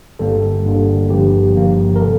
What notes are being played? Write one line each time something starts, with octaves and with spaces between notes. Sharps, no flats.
G1 G2 D3 G3 A#3 A4
G1 G2 D3 G3 A#3
G1 G2 F3 A#3 G4
G1 G2 F3 A#3
A#4
C3 A4